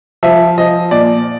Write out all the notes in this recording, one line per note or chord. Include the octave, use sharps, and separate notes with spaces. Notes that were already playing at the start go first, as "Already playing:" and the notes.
F3 E5
F3 D#5
A#2 D5